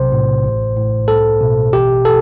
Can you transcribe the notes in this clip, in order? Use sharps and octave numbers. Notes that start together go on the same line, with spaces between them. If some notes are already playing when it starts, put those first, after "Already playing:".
Already playing: B1 C3 C5
A2
A1
A2
C2 A4
B2
A1 G4
A4